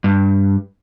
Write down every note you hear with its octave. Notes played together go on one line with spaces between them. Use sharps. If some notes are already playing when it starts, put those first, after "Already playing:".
G2